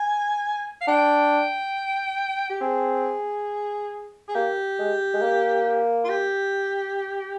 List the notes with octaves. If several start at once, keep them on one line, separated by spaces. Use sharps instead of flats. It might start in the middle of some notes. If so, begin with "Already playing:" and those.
Already playing: G#5
F5
D4 G5
G4
C4 G#4
G#4
A#3 G4
G#3
G#3
A#3
F4
G4